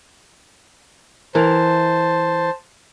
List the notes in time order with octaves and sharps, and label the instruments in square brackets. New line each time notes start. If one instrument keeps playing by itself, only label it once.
[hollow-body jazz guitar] E3 A#4 [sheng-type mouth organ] C5 A5